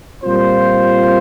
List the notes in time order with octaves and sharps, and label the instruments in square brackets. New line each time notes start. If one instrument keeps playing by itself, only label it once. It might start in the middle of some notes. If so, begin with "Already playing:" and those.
[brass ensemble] A#2 G3 C4 F4 C5